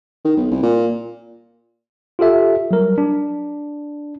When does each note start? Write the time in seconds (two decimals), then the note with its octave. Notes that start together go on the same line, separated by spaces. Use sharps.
0.25 D#3
0.37 B1
0.51 C2
0.63 A#2
2.19 F4 G4 A4 E5
2.71 F#3 G3 A#4
2.98 D4